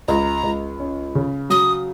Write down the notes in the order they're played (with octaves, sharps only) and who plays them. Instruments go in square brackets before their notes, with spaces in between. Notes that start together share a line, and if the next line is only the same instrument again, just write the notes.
[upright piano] C#2 [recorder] A#5
[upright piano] C#2
C#4
C#3
[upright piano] F#3 [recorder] D#6